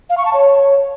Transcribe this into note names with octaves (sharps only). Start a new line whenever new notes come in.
F5
C#6
A5
C#5